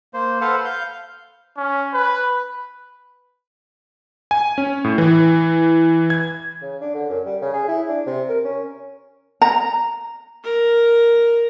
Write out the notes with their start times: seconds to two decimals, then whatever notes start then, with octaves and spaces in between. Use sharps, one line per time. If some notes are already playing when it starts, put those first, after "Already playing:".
0.14 A#3 C5
0.41 A4 B4 C5 F5 F#5
0.65 F5 G6
1.57 C#4
1.93 B4
4.31 G#5
4.58 C#4
4.84 A2
4.98 E3
6.10 G#6
6.62 C#3
6.81 D4
6.94 D3
7.09 F#2
7.26 G3
7.41 C#3
7.53 G#4
7.68 E4
7.88 D4
8.06 C3
8.29 A#4
8.44 C#4
9.42 A#5
10.44 A#4